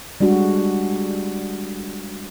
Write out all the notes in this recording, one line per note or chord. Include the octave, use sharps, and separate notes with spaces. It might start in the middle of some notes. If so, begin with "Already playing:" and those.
G3 G#3 D4 F#4